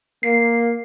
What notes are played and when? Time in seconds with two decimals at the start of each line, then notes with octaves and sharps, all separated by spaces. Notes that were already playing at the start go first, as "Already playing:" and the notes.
0.23 A#3 C7